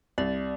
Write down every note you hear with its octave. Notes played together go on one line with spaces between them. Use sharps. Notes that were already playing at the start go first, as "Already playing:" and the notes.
C2 D5